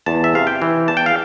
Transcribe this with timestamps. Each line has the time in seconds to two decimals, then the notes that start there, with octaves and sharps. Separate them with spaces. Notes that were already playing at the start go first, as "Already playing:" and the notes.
0.06 E2 A5
0.24 E5
0.34 C3 F5
0.47 G5
0.62 E3
0.88 E2 A5
0.97 G5
1.06 F5